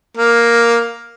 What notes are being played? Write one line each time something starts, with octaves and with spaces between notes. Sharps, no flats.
A#3